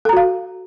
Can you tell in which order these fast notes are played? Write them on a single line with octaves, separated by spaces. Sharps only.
A4 A#5 F#4 F5